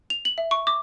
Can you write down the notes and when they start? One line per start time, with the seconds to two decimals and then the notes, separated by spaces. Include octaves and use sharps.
0.10 F7
0.25 F#7
0.38 E5
0.51 C#6
0.67 D6